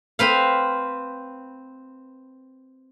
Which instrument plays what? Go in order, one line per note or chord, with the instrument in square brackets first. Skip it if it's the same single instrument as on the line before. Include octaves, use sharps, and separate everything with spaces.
[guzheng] C4 B4 F5